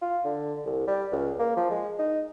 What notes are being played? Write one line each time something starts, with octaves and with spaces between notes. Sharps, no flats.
F4
D3
C2
G3
C#2
A#3
F3
G#3
D#4